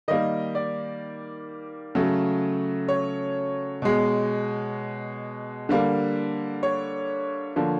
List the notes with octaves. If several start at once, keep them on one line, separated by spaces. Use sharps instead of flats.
D#3 G3 A#3 D#5
D5
C#3 F#3 A3
C#5
B2 G#3
D3 G3 A#3
C#5
D3 F3 A#3